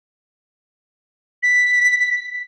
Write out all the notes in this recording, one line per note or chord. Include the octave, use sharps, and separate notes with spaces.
B6